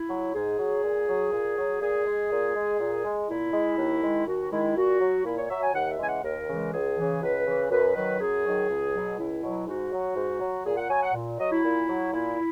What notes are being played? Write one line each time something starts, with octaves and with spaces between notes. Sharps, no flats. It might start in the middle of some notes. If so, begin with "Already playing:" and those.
Already playing: E4
F#3
G#2 G#4
F#3
A#2
F#3
A#2
F#3
A#2 G#4
G#3
A#2
G#3
A#2
G#3
A#2 E4
G#3
D#2
D#3 G#3
D#2 F#4
D#3 G#3 E4
A#2 F#4
F#3
A#2 E4
C#5
F#3 E5
G#5
D#2 F#5
E5
C#3 E3 G#3 G#5
F#5
D#2 A#4
C#3 E3 G#3
C#2 G#4
C#3 E3
C#2 B4
C#3 E3
F#2 B4
D#3 F#3 B4
F#2 G#4
D#3 F#3
C#2
B2 F#3
C#2 E4
B2 F#3
G#2 F#4
F#3
G#2
F#3
A#2 G#4
F#5
F#3 G#5
F#5
A#2
F#3 D#5
E4
A#2
F#3
A#2 E4